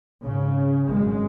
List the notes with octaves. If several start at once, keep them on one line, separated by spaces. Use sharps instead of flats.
G#1 G#2 C#3
G#1 F#2 C#3 G#3